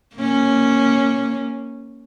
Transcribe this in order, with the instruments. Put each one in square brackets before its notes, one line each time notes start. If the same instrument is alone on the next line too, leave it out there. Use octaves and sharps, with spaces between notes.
[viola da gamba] A#3 C#4